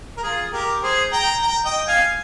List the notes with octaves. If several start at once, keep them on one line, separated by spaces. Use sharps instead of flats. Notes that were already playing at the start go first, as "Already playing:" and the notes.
A#4
F4 G#4
G4 A#4
G#4 C5
G5 A#5
G5 A#5
D#5 G5
F5 G#5